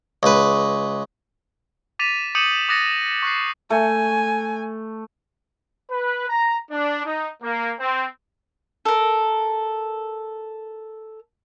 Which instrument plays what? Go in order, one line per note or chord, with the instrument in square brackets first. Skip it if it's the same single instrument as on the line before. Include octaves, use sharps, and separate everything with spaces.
[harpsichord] C#2 B4
[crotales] D6 A6 B6 D#7 F7
D6 D#6 G6 C#7 D#7 F#7
D6 D#6 F#6 A6 A#6 C#7
C#6 F#6 C7
[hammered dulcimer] A3 [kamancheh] G#5
[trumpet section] B4
A#5
D4
D#4
A#3
C4
[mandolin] A4 A#4